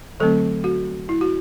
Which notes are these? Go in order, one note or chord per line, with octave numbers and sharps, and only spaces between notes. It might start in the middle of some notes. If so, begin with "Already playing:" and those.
D3 F#3 A3 C4 A4
F#4
E4
F#4